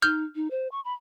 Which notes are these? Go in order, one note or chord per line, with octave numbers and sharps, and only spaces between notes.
D#4 F6 G6
D#4
C5
C#6
B5